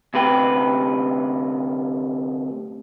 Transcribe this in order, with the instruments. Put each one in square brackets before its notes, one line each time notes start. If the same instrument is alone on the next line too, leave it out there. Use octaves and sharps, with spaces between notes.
[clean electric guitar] D2 C3 B4 G5